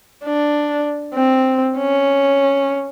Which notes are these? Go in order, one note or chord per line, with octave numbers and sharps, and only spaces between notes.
D4
C4
C#4